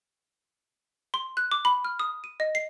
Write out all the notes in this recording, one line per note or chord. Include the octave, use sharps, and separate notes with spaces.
C6
F#6
D6
B5
F6
D#6
D#7
D#5
C7